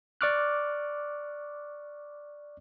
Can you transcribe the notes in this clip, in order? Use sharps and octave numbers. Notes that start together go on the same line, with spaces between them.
D5 C#6 D6 F6 F#6